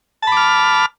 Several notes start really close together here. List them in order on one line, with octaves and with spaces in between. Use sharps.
A5 B5 D6 F6